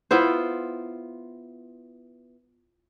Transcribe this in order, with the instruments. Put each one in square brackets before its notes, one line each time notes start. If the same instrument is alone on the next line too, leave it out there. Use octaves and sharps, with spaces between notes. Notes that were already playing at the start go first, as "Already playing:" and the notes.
[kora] B3 E4 F4 C5